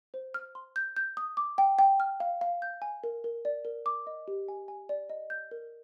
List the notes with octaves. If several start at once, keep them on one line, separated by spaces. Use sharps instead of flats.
C5
F6
C6
G6
G6
D#6
D6
G5
G5
F6
F5
F5
G6
G#5
A#4
A#4
D5
A#4
D6
D#5
G4
G#5
G#5
D5
D#5
G6
A#4